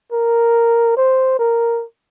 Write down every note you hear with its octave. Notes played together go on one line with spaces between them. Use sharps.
A#4
C5
A#4